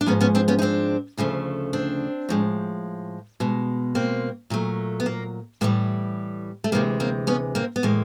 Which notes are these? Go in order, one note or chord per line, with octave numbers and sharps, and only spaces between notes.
D4
G#2 F3 G#3 B3 C#4
B3 C#4
C4 D4
B3 C#4
D#4
C4 D4
D2 C#3 F3 A3
C4 D4
A2 F3 G#3
B2 G#3
A#3 C4
A#2 F#3 A3
B3
A#3
A2 E3 G3 A#3
A3
D2 C3 E3 G#3 A#3
A#3 C4
B3 C#4
A#3 C4
B3
A2 E3 G#3 A#3